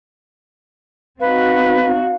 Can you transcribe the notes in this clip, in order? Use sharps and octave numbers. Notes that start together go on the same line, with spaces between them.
C4 D#4 F#4 B4 F5